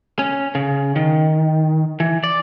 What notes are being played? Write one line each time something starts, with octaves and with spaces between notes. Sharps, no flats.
C#4
C#3
D#3
E3
D5